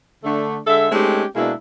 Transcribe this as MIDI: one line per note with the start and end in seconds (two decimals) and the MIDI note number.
0.24 0.58 50
0.24 0.58 57
0.24 0.58 62
0.67 0.87 50
0.67 0.87 56
0.67 0.87 69
0.67 0.87 76
0.92 1.24 56
0.92 1.24 57
0.92 1.24 60
0.92 1.24 61
0.92 1.24 63
0.92 1.24 67
1.36 1.53 47
1.36 1.53 56
1.36 1.53 58
1.36 1.53 62
1.36 1.53 64